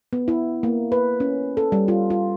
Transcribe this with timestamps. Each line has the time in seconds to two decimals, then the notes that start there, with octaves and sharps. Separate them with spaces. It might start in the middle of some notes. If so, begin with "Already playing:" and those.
0.13 B3
0.28 E4
0.63 A#3
0.92 B4
1.20 C#4
1.57 A4
1.72 G3
1.88 F4
2.10 F4